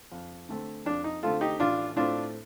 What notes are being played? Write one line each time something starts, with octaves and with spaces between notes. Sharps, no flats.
F2
D3 A3 C4
F2 D4
D#4
D3 A3 C4 F4 A4
D#4 G4
A1 D4 F4
A2 A3 C4 D4 F4